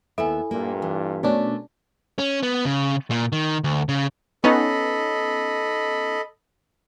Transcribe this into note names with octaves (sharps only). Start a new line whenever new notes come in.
D#2 B3 E4 A4 E5 G#5
G2 A#2 A#3
E3
B2 A3 C#4 D4 A#4
C#4
B3
C#3
A#2
D#3
D2
C#3
B3 C#4 D#4 A4 D#5 B5